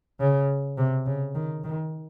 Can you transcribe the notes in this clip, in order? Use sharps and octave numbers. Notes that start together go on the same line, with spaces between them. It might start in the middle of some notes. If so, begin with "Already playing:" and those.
C#3
C3
C#3
D#3
D#3